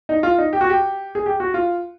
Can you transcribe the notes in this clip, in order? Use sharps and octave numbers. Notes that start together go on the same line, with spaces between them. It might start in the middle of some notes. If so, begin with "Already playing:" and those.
D#4
F4
D#4
G4
F#4
G4
G#4
G4
F#4
F4